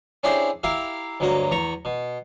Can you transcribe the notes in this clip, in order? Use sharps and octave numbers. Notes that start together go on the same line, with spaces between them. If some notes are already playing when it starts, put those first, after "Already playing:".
C#4 D4 E4 G4 G#4 C5
E4 G4 A#4 E5 F5
D2 G2 F#3 A#3 D#5
E2 A#5 B5 C#6
B2